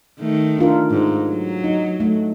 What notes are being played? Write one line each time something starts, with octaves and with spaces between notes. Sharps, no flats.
D#3 A3
D4 F4 A#4
G#2
F#3
D#4
A3